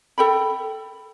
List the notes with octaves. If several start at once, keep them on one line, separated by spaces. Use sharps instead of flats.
A4 G5 B5